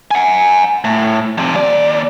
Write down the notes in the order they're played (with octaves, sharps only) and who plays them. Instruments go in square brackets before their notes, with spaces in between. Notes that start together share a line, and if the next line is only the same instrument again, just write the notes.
[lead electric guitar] F#5 G#5
A2
F2 C3
D#2 D5